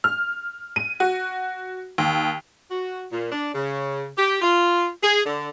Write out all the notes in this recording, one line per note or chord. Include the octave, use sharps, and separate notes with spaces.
F6
D#7
F#4
D#2
F#4
A#2
D4
C#3
G4
F4
G#4
D3